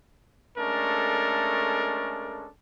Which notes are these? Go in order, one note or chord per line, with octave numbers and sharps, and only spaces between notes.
G#3 A3 C#4 D4 A4 A#4